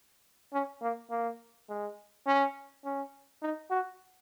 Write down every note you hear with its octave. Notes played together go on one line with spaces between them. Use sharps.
C#4
A#3
A#3
G#3
C#4
C#4
D#4
F#4